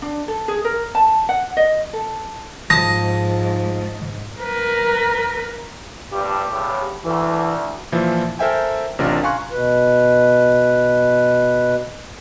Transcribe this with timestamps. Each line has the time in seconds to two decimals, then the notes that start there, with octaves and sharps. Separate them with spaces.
0.02 D4
0.28 A4
0.48 G#4
0.64 A#4
0.95 A5
1.29 F#5
1.57 D#5
1.93 A4
2.70 G#2 F3 A5 D#6 A#6
4.41 A#4 B4
6.12 A#1 G2 G4
6.49 E2 A2 C#3
7.04 D2 E3
7.92 A#2 E3 F3 E4
8.39 A4 A#4 C5 E5 G5 G#5
8.99 A1 C3 C#4 D4 F4 A#4
9.23 F5 G#5 A#5 C6 C#6 F#6
9.51 B2 B4